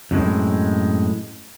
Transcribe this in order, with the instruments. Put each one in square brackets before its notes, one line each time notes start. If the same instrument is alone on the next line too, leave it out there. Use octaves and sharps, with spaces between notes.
[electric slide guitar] F#2 A2 G#3 C4